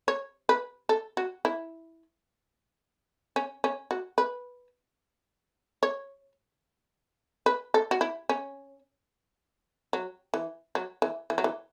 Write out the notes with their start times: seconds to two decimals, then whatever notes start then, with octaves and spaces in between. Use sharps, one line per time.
0.08 C#5
0.49 B4
0.89 A4
1.17 F#4
1.45 E4
3.36 C#4
3.64 C#4
3.91 F#4
4.18 B4
5.83 C#5
7.46 B4
7.74 A4
7.91 F#4
8.01 E4
8.29 C#4
9.93 F#3
10.34 E3
10.75 F#3
11.02 E3
11.30 E3
11.38 F#3
11.44 E3